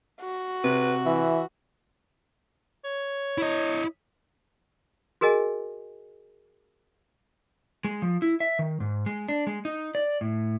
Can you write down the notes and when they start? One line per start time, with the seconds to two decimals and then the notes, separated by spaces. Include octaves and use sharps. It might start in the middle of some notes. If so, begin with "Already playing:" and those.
0.21 F#4
0.64 C3 B4
1.06 E3 E5
2.84 C#5
3.38 E4 D#5
5.21 F#4 G#4 A#4 D#5 G#5
7.84 G#3
8.02 F3
8.22 E4
8.40 E5
8.59 D#3
8.80 G#2
9.06 G#3
9.28 D4
9.47 G#3
9.65 D#4
9.95 D5
10.21 A2